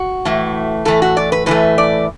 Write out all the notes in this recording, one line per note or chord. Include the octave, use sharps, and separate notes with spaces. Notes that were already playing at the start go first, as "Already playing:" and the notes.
Already playing: F#4
A2 E3 A3
A2 E3 A3 A4
F#4
D5
B4
A2 E3 A3 B4
D5